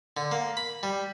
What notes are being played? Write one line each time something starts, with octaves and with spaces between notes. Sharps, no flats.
D3
A#3
B5
G3